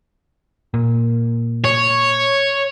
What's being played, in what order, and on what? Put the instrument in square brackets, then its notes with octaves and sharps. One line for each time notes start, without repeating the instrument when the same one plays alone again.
[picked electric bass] A#2
[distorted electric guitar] C#5